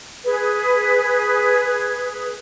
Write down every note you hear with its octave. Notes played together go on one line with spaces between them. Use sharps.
G#4 B4